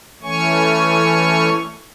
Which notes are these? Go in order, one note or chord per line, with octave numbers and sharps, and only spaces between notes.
E3 A3 C#4 C#5 G#5 C#6